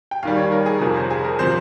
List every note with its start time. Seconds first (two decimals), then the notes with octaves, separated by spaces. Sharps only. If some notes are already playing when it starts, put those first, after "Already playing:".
0.11 G5
0.23 D#2 D#3 G3 F5
0.37 C#5
0.52 A#4
0.66 G#4
0.81 F2 C3 F3 A#4
0.96 C5
1.10 G#4
1.24 A#4
1.39 C3 F3 C5